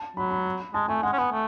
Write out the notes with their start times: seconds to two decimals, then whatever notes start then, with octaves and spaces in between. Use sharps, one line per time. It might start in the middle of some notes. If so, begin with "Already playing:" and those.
Already playing: A5
0.17 F#3 B5
0.31 B5
0.74 G#3 A5
0.88 A3 G#5
1.03 G#3 F#5
1.13 C#4
1.18 B3 G#5
1.32 A3